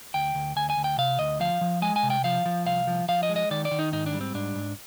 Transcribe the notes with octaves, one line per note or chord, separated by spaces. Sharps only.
D2 G5
D2
D2 G#5
G#5
D2
G5
C3 F5
D2 D#5
F3 F5
F3
G#3 G#5
G#5
C3
G5
F3 F5
F3
C2 F5
F3
F3 F5
D#5
G#3
D#5
D#3 D5
D5
D#3
D#4
G#2 D#4
D4
G3
C4
G#2 D4
G#2